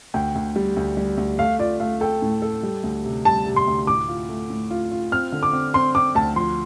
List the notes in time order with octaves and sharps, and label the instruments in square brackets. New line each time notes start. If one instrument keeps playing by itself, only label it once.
[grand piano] D2 [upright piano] G5
[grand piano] D2
G3
D2
G3
D2
[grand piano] A3 [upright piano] F5
[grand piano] F4 [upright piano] D5
[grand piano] A3 [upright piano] F5
[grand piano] A4 [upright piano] G5
[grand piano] A2
A4
G3
D2
C3
[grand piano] G3 [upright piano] A5
[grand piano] C3
[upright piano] C6
[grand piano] D2
[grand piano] A2 [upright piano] D6
[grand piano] F4
A3
A2
F4
F4
[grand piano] C4 [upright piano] F6
[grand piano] D3
[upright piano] D6
[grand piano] C4
[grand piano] C4 [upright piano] C6
[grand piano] C4 [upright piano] D6
[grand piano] D2 [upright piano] A5
[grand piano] F3 [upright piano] C6